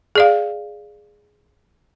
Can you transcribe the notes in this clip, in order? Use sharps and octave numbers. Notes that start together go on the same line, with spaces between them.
G#4 D5 F5